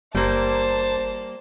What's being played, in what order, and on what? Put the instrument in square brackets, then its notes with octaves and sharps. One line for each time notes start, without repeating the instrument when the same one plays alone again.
[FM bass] F#1 [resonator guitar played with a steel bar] G3 A#3 [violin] C5 A5